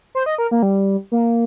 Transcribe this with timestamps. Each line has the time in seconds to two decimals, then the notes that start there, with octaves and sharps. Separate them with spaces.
0.15 C5
0.26 D#5
0.38 A#4
0.51 A#3
0.63 G3
1.12 A#3